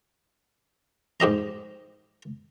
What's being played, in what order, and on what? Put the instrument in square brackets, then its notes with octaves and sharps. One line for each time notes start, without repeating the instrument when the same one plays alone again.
[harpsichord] G#2 G4 D#5 A#5